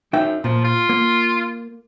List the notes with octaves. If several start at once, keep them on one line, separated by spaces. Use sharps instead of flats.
F#2 D#4 E5 G5
A#2 F3
F4
A#3